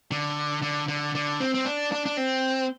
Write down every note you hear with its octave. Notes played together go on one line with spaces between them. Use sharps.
D3
D3
D3
D3
C4
C4
D4
D4
D4
C4